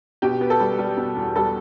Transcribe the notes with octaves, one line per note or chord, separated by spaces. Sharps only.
B2 G4
B3
A4
G3
G3
B2
E2
G3 A4